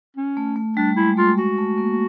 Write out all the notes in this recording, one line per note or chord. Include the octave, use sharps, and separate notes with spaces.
C#4
A3
A3
G3 D4
G#3 E4
A3 F4
G#3 F#4
A3
A#3